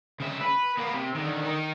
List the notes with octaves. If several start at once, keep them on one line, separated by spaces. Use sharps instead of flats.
C#3 E5
B4
A#3 B3
C3
D3 D#3
D#3 D#4